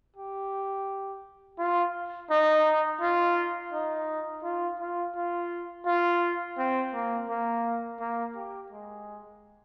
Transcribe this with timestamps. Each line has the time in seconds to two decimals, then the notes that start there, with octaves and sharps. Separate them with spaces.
0.16 G4
1.58 F4
2.30 D#4
3.01 F4
3.72 D#4
4.43 F4
4.80 F4
5.15 F4
5.86 F4
6.58 C4
6.94 A#3
7.29 A#3
8.00 A#3
8.36 G4
8.72 G#3